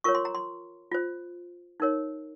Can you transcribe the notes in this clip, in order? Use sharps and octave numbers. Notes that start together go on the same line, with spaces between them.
F4 A#4 C#5 C#6
C6
A#5
C6
F4 C5
D#4 A#4 C#5